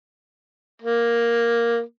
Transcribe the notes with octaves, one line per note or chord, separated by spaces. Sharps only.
A#3